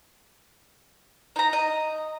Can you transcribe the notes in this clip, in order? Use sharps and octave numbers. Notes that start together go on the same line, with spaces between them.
D#4 A#5
D#5